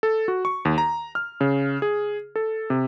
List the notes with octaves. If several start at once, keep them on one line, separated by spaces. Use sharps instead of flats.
A4
F#4
C#6
D#2
A#5
F6
C#3
G#4
A4
C3